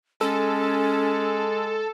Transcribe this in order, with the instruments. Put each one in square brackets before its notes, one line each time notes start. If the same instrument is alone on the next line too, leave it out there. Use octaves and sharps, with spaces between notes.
[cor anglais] G#3 [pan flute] C#4 [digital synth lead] A4